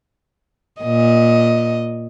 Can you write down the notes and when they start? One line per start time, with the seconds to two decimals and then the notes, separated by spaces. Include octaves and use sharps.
0.81 A#2 D#5